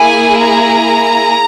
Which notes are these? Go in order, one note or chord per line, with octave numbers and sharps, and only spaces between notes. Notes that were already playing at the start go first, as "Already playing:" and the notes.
Already playing: A#3 E4 G#4 G#5
A#5